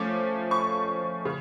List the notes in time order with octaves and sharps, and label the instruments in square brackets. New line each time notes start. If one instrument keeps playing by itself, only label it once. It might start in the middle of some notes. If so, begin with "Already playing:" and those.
Already playing: [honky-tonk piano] F3 A3 C#4 D6
C#6
C#3